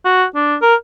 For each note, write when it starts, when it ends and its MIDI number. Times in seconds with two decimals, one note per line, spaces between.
0.05 0.25 66
0.35 0.55 62
0.62 0.75 70